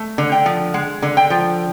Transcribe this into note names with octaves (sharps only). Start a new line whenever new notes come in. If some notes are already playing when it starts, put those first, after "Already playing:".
Already playing: A3
D3
G5
F3
G#3 F#5
D3
G5
F3